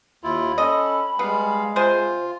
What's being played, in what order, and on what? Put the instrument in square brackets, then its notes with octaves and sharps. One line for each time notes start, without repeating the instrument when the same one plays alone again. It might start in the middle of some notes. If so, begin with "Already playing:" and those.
[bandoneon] D#2 E4 F4 [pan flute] B5
[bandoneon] C#4 A4 [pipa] D#5
[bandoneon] G3 F5 [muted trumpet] G#3 [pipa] B3
[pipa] C3 G#4 C5 [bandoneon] F4